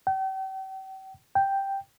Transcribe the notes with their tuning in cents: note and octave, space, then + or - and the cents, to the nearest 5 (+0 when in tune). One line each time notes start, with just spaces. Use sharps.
G5 -40
G5 +0